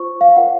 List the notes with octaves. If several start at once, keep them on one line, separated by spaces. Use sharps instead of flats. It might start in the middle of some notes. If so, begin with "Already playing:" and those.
Already playing: F4 C5 C#6
F5
F4 A#4 C#5 F#5